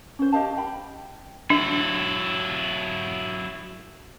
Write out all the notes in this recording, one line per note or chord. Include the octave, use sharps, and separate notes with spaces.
C#4 C5
G4 D#5 F5 A5
G5 B5
F#3 D4 E4